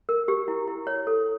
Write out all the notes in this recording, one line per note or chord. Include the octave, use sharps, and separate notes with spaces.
A#4
G4
E4
E4
C#5
A4